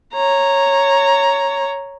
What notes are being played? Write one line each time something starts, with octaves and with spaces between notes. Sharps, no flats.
C#5 A#5